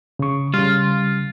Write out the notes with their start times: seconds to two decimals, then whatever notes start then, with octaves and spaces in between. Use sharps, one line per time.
0.19 C#3 C#6
0.54 C#3 G3 F4